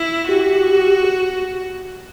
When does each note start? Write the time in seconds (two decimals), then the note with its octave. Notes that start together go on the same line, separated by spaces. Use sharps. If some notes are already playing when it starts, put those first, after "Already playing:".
Already playing: E4
0.28 F#4 G4